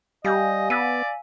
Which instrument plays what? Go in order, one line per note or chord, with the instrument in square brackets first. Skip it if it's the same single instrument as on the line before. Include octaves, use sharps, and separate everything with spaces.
[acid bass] G3 [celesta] G4 G6 [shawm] D#5 [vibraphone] F5 G#5
[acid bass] B3 [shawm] D5 [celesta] E6 B6 D#7